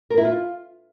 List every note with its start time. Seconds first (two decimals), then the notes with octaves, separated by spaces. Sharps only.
0.10 A#4
0.18 E4
0.25 F4